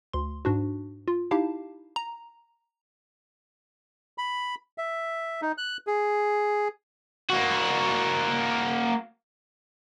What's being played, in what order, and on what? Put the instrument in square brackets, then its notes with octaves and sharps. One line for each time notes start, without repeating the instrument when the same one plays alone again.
[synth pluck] D2 C6
G#2 D4 F#4
F4
D#4 E4 G4 F5 A5
A#5
[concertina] B5
E5
D#4
F#6
G#4
[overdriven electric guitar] A#3 F#4